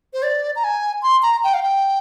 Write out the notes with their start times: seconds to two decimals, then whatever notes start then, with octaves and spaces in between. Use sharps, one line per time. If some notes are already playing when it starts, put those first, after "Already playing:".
0.13 C5
0.23 D5
0.56 A#5
0.64 G#5
1.03 C6
1.22 A#5
1.44 G5
1.54 F5
1.63 G5